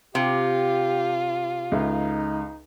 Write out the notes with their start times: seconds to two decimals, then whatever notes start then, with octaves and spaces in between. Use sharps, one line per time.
0.15 C3 F4 G4
1.72 C#2 D#4 A4 E5